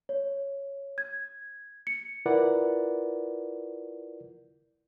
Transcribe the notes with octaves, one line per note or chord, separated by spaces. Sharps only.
C#5
G#6
C#7
E4 F4 A#4 B4 D5 F#5